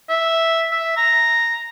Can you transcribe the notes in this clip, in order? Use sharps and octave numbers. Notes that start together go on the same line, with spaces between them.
E5
E5
A#5